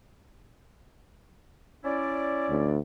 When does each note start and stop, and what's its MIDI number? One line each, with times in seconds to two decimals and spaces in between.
1.84 2.75 61
1.84 2.75 64
1.84 2.75 74
2.49 2.79 38